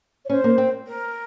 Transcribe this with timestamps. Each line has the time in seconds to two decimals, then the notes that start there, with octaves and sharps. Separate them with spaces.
0.25 C#5
0.29 C#4 C5
0.44 A#3
0.58 C4
0.87 A#4